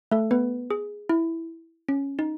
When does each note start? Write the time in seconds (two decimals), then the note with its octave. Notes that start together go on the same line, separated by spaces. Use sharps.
0.11 A3 A4
0.31 B3 B4
0.70 G#4
1.09 E4
1.88 C#4
2.19 D#4